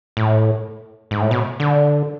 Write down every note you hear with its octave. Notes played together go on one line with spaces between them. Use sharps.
A2
G#2
A2
B2
D3